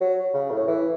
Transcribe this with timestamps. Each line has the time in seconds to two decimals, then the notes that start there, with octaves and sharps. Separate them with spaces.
0.01 F#3
0.34 C#3
0.51 A2
0.67 E3